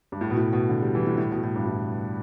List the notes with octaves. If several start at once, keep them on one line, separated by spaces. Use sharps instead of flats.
G2
A2
B2
A2
B2
D3
G3
E3
A2
A2
B2
A2
G2
A2